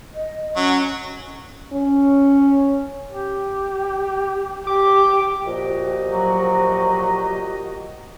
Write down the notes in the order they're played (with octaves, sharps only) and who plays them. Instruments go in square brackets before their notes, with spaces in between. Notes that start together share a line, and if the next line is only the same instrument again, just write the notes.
[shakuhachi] D#5
[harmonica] F#3 [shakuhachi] C#4
[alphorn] C#4
[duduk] G4
[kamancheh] G4 [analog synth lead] D6
[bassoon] A#2 [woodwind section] F3 [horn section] F#4 G4 D#5
[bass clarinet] F#3